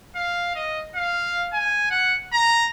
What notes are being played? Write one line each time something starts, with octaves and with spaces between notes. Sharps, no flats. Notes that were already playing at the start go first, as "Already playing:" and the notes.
F5
D#5
F5
G#5
F#5
A#5